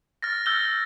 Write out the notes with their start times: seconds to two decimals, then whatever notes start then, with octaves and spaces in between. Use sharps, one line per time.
0.22 F6 A6 A#6
0.46 E6 F6 G6 A#6 G7